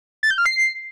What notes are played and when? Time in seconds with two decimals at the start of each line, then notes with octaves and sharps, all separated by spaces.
0.23 A6
0.30 G6
0.38 F6
0.46 C7